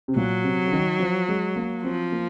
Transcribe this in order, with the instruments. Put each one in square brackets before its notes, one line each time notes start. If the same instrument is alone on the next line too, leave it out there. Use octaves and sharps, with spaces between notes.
[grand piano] C3
[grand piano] A#2 [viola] F#3
[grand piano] C3
C#3
D#3
F3
G#3
A#3
[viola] F3 [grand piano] C4
[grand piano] A#3